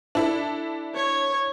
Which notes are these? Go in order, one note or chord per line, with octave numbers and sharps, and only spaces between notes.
D4 E4 A4
C#5